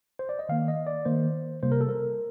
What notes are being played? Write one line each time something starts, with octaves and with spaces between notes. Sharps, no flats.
C5
D5
D#5
D#3 A#3 F5
D#5
D5
D#3 A#3 C5
C3 G3 A#3 C5
A#4
A4
A#4